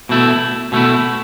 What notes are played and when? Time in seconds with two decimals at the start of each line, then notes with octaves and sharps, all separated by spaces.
0.09 B2 A3 E4
0.72 B2 A3 E4